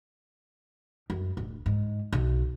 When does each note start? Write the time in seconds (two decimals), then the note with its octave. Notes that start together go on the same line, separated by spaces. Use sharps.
1.10 F#2
1.37 D1
1.66 G#2
2.13 B1